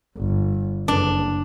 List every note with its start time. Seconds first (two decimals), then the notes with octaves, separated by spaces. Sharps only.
0.16 G1
0.88 F#1 D4